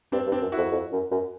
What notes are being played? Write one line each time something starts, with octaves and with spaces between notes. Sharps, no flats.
G2 C4 D4
G2
C4 D4
F#2
E4 F#4
F2
F2
F#2
F#2